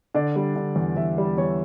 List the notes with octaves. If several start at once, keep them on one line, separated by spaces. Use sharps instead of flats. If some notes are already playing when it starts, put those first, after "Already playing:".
D3 D5
G3
D3
E2
E2 E5
G3
E2 C#5